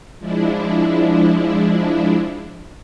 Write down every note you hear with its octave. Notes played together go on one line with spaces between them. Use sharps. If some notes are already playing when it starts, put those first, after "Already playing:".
F3 G#3 D4 E4